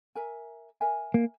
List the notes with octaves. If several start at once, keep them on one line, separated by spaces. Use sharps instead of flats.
A#4 E5 G#5
A#4 E5 G#5
A#3